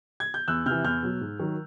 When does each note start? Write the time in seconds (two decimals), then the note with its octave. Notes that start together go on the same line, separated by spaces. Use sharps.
0.20 G#6
0.34 G6
0.48 E2 E6 F#6
0.66 C3 E3 F6 G6
0.84 E2 F6 G6
1.03 B2 F#3
1.21 G#2
1.39 D#3 F#3